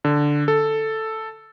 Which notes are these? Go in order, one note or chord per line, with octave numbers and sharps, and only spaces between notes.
D3
A4